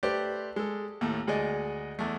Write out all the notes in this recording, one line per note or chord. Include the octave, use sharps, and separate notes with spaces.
A3 G4 B4 C5 D5
G#3 A4
D#2 A2 A3
D2 G#3 G#4 D5 D#5
E2 A3